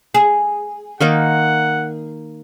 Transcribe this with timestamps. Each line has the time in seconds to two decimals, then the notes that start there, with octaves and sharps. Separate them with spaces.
0.14 G#4
1.00 D#3 A#3 D#4 F#5